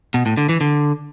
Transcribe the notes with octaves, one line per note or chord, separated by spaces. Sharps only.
B2
A2
D3
E3
D3